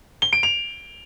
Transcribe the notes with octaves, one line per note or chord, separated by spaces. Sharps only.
G7
D7
F7